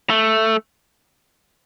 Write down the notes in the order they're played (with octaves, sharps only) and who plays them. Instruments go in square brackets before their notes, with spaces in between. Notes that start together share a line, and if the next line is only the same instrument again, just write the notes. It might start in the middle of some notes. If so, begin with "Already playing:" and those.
[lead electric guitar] A3